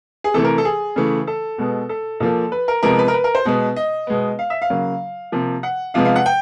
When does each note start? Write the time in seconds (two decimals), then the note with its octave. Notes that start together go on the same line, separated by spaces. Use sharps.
0.24 G#4
0.34 C3 E3 A3 A4
0.44 A#4
0.58 A4
0.65 G#4
0.96 C#3 E3 A3
1.27 A4
1.58 B2 G#3 B3
1.89 A4
2.20 A#2 F3 A#3 A4
2.52 B4
2.68 A#4
2.83 C3 F3 G#3 B3 A#4
2.99 B4
3.08 A#4
3.14 B4
3.24 A#4
3.35 C5
3.45 B2 G#3 B3
3.76 D#5
4.07 B2 G#3 B3
4.39 F5
4.50 E5
4.62 F5
4.70 C#3 F#3 A#3
5.32 C3 F3 A#3
5.63 F#5
5.94 C3 F3 G#3 B3 F5
6.05 F5
6.16 F#5
6.26 G5